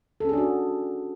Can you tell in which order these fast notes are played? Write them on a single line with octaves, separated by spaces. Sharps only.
A4 C#4 G#4 D4 F#4